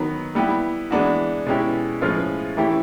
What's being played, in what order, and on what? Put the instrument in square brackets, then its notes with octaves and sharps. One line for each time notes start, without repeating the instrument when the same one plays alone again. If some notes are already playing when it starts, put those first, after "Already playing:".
Already playing: [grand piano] D#3 F#3 B3
G3 B3 E4 G4
E3 G#3 B3 D4 F#4
B2 G#3 C#4 E4 G4
A2 F3 G#3 C#4 F4
E3 A3 C#4 E4 G4